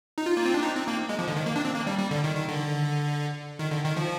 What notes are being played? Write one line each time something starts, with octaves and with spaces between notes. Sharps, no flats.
D#4
F4
A#3
C4
D4
D#4
C4
A#3
G#3
F3
D3
D#3
A#3
D4
C4
A#3
G3
G3
D3
D#3
D#3
D3
D#3
D3
D#3
F3